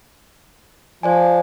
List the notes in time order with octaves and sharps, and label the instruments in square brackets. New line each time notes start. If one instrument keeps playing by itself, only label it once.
[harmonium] F3 [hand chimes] C5 D5 G#5